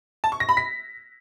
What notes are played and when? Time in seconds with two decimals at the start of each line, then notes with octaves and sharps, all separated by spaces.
0.24 A5
0.32 C#6
0.40 A#6
0.49 B5
0.57 B6